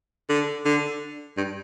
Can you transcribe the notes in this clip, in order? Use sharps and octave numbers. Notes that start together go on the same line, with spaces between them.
D3
D3
G2